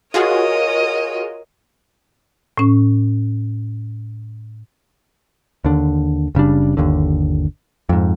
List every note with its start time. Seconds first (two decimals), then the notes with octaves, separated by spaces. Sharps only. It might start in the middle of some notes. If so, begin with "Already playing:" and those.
0.14 F4 F#4 G#4 A#4 C#5 D#5
2.57 A2 C#4
5.64 D#2 D3
6.35 F#1 C#3 G3 D4
6.77 G1 D#2 D3
7.89 F2 G#2